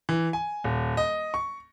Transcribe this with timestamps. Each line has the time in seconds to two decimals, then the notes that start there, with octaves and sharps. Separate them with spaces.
0.09 E3
0.33 G#5
0.64 D#1
0.97 D#5
1.34 C#6